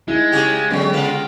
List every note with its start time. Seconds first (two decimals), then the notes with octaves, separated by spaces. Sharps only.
0.08 G#3 D#4 E4
0.32 C#3 G4
0.70 D3 F#3 G#3 B3 C#4 G4
0.93 C#3 F4 B4